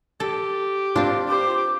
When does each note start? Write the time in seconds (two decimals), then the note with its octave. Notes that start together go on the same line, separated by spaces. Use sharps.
0.20 G4 A4
0.96 C4 D4 F4 D5
1.28 G4 C5 D6